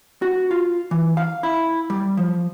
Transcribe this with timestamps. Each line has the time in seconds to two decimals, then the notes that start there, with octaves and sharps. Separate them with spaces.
0.22 F#4
0.51 F4
0.91 E3
1.17 F5
1.43 E4
1.90 G3
2.17 F3